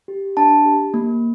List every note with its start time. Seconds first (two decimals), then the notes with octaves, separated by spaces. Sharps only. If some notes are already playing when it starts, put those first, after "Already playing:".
0.08 G4
0.37 D4 A5
0.65 G4
0.94 A#3